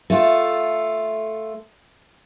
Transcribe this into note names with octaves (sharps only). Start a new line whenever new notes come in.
A3 F4